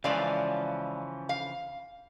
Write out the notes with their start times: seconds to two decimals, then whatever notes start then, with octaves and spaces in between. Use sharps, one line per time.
0.04 C#3 E3 F3 G#3 D5 F5
1.29 F5